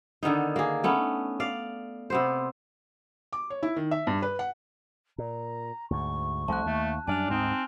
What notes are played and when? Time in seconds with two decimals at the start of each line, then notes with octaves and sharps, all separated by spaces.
0.23 D3 D#3 B3 D#4
0.56 A#3 G#4
0.84 A3 B3 C#4
1.40 D5 F5
2.10 C3 B3 C5
3.33 D6
3.50 C#5
3.63 E4
3.76 D#3
3.91 E5
4.07 G2
4.22 B4
4.39 F#5
5.18 A#2 A#5
5.91 D2 G#2 C#6
6.48 C2 F3 A3 A5 F#6
6.66 D#2 A3
7.07 F#2 G3 D4 D5 G#5 F6 F7
7.30 D2 G#2 C4 D#4